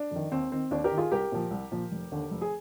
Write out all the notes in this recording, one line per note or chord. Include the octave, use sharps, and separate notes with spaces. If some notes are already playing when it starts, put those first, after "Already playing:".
Already playing: D4
F2 D#3
D#2 C4
D#3 C4
D#2 D4
G4 A#4
D#3
F4 G#4
C2 G4 A#4
A#2 F3
C2
A#2 F3
F1
D#2 D3
F1
G#4